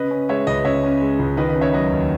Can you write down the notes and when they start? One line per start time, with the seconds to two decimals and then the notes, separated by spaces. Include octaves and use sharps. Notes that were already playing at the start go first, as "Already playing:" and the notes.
Already playing: C#3 B4 D#5
0.11 C#4
0.29 G#3 C#5 E5
0.47 C#2 B4 D#5
0.65 C#3 C#5 E5
0.83 C#4
1.01 G#3
1.19 C#2
1.37 D#3 B4 D#5
1.49 B4 D#5
1.56 C#4
1.61 C#5 E5
1.73 F#3 B4 D#5
1.92 D#2